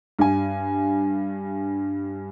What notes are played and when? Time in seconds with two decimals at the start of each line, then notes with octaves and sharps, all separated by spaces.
0.19 G2 G#5